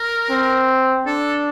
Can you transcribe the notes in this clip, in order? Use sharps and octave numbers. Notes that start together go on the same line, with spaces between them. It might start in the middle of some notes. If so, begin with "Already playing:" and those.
Already playing: A#4
C4
D4 A4